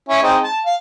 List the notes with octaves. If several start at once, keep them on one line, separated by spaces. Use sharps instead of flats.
C#4 E4
G#3 C4 D#4
A5
F5